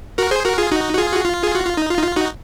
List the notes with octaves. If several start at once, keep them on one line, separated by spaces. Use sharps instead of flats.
F#4 A#4
G#4 C5
F#4 A#4
F4 G#4
D#4 F#4
F#4
F4 G#4
F#4
F4
G#4
F#4
F4
D#4
F4
D#4
F4
D#4 F#4